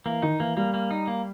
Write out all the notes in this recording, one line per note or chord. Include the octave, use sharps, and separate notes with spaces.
E3 A#3
D#3 D#4
E3 A#3
G3 A#3
A#3
D#4
A#3